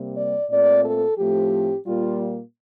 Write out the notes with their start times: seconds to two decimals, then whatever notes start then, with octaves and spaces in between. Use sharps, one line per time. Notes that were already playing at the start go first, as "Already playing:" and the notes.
Already playing: C3 G3 A#3
0.17 D5
0.50 A#2 A3 C4 D5
0.85 A4
1.18 A2 F3 A3 C4 G4
1.87 A#2 G3 A#3 F4